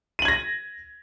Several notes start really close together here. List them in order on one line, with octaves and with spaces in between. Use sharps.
D#7 F#7 G#6 A#6